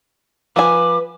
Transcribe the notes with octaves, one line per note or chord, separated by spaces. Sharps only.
F3 B4 G#5 D6